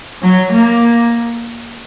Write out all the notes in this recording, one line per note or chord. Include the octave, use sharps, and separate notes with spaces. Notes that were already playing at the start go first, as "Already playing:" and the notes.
F#3
A#3